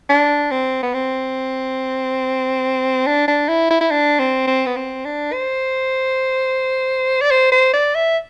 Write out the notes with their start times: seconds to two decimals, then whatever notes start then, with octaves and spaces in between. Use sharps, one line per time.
0.09 D4
0.51 C4
0.83 B3
0.94 C4
3.06 D4
3.28 D4
3.48 E4
3.70 E4
3.81 E4
3.91 D4
4.19 C4
4.47 C4
4.66 B3
4.76 C4
5.05 D4
5.33 C5
7.21 D5
7.31 C5
7.51 C5
7.73 D5
7.95 E5